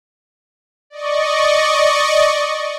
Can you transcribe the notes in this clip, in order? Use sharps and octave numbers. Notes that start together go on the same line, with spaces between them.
D5 D#5 C#6